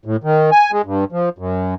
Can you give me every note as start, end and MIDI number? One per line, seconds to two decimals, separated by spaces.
0.05 0.17 45
0.24 0.50 51
0.52 0.71 80
0.72 0.82 56
0.85 1.05 43
1.12 1.29 53
1.38 1.75 42